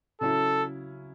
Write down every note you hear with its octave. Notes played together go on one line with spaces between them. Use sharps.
C#3 F#3 C#4 E4 A4